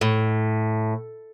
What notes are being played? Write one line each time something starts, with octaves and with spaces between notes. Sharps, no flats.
A2